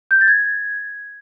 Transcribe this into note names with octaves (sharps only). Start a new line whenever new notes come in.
G6
A6
G#6